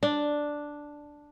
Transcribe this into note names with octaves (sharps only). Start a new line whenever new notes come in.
D4